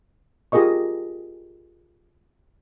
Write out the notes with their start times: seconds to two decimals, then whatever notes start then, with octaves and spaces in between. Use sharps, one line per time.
0.52 F4 G4 G#4 A#4 D#5 C#6